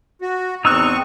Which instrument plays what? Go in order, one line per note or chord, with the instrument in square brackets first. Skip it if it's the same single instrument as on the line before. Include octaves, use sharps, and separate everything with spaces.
[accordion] F#4
[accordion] E2 C4 C#6 [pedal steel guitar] D#4 E6 F#6